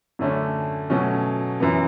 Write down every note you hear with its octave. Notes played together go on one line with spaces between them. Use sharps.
F#2 D3 A3 C#4
B2 F#3 A3 C#4
F#2 E3 B3